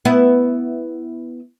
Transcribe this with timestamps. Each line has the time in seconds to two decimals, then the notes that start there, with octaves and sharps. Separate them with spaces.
0.05 B3 E4